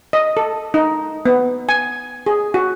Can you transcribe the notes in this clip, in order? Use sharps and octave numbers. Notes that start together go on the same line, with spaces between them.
D#5
A4
D#4
B3
G#5
G#4
F#4